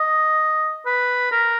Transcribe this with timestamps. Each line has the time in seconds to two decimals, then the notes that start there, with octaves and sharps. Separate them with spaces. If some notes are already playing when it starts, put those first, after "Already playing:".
Already playing: D#5
0.86 B4
1.32 A#4